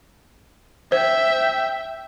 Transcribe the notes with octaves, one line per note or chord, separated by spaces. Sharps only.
C5 E5 G5